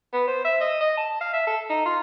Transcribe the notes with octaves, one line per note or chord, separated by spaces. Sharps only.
B3
C5
E5
D#5
D#5
A5
F5
E5
A4
D#4
F4